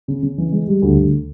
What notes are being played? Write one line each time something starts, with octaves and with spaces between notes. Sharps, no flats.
C#3
C#3
E3
G#3
G3
D2
D2